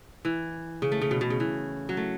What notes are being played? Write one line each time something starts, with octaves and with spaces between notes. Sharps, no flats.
E3
C#3
A3
C#3
B2
B2
C#3
E3
F#3
A3